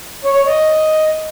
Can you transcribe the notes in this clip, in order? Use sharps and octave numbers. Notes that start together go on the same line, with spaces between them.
C#5
C#5
D#5